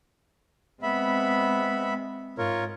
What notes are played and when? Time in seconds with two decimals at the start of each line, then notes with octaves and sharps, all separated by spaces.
0.83 G#3 B3 C4 E5 B5
2.38 G#2 F4 A#4 C#5